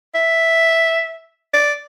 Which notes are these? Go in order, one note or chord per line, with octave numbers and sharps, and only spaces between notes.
E5
D5